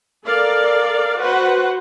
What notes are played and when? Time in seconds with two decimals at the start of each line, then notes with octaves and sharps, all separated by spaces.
0.24 A4 A#4 D5 F5
1.18 F#4 B4 C5 F#5